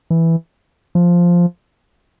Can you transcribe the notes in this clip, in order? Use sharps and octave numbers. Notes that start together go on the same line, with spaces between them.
E3
F3